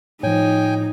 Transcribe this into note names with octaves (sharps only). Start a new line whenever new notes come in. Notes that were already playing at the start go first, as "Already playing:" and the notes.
A2 F3 D#4 C#5 G5 G#5